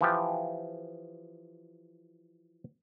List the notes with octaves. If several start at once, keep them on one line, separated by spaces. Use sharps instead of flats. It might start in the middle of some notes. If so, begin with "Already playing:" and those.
E3 F3 G4